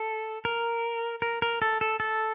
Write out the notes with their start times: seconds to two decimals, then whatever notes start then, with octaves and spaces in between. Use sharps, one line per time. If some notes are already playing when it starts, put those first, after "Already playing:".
Already playing: A4
0.45 A#4
1.22 A#4
1.42 A#4
1.62 A4
1.81 A4
2.00 A4